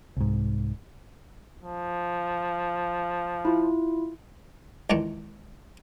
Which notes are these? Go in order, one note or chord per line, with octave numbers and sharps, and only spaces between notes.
C2 G#2
F3
E4 F4
C#2 D#3 E3 D4 C#6